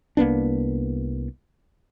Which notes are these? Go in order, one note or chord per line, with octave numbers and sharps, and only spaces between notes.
C2 A#3 B3 D4